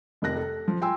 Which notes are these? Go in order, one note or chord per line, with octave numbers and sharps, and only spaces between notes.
F1 C3 A#4 F#6 A#6
A4
F3
F4 G5 G#5 C6 E6